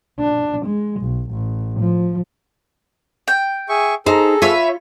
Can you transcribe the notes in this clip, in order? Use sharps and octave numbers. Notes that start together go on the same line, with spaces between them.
D4
G#3
B1
A1
F3
G5
G#4 E5 C#6
D#4 G#4 A4 C5 A#5
F4 B4 C#5 E5